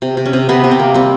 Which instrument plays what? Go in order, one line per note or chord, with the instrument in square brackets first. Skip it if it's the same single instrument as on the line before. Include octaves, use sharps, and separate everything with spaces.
[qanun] C3
C3
C#4
C3
C3 B3
C3
C4
A#3
G3 C4